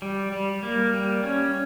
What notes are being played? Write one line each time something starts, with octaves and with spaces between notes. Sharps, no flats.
G3
G3
A#3
G3
C#4